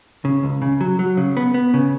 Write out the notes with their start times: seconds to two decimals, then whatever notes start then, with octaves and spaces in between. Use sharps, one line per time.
0.25 C#3
0.43 C#2
0.62 C#3
0.81 F#3
0.99 F#3
1.17 C#3
1.37 B3
1.54 B3
1.74 C#3